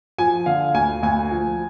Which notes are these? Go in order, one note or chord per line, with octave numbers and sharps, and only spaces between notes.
F3 G#5
D3 F5
D2 G#5
D2 G#5
F3